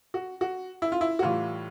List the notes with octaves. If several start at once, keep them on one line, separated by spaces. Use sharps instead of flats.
F#4
F#4
E4
F4
E4
F#4
A2 E3 G3 F4